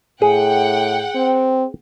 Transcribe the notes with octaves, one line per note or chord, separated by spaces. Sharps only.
A2 G#4 F#5 G5
C4